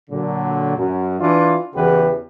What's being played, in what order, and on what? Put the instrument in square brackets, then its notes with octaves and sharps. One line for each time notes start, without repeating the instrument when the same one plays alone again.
[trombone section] A#2 D3 F#3
F#2
E3 D4 F4
E2 C#3 E3 F#4 G4 B4